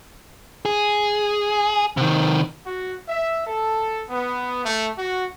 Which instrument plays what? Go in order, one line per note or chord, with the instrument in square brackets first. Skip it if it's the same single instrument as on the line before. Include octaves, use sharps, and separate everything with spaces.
[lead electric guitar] G#4
C3 D#3
[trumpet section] F#4
E5
A4
B3
A3
F#4